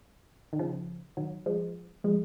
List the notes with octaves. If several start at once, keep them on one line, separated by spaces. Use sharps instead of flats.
D#3
C#3 F3
D#3 F#3
F3 G#3
F3 G#3